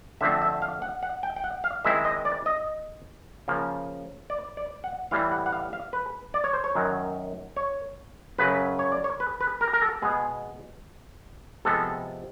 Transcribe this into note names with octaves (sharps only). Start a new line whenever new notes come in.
D3 F3 A3 C4 E5
E5
F5
F#5
F#5
G5
G5
F#5
F5
D#3 G#3 C4 E4 E5
D#5
D5
D#5
C#3 F3 A#3
D5
D5
F#5
A2 E3 G3 F5
F#5
F#5
F5
F5
B4
D5
C#5
C5
C#5
F#2 D#3 F#3
C#5
F#2 C#3 F#3 B4
C#5
D5
C#5
B4
B4
A#4
A#4
A4
B2 G#3 B3 G#4
C3 F3 G#3 B3 A4